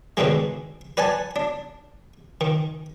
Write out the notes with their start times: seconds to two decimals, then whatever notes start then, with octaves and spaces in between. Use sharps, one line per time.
0.17 G#2 B2 D3 D#3 G#3
0.97 B4 D5 F#5 G#5 A5
1.36 D4
2.41 D#3